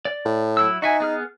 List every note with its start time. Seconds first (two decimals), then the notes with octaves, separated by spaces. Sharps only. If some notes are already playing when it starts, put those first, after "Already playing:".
0.05 D5
0.25 A2
0.57 F#3 E4 E6
0.82 D#4 F#4 E5 G#5
1.00 B3 G#4 F6